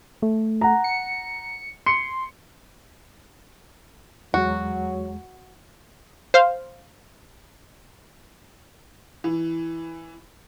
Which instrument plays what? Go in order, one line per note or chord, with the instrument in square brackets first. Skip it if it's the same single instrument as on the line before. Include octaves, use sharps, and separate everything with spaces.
[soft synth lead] A3
[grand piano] F#5 A#5
[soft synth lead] C#7
[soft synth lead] C6 [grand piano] C#7
[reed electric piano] E2 G#3 [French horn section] F#3 [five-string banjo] F#4
[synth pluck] C5 F5
[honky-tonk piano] E3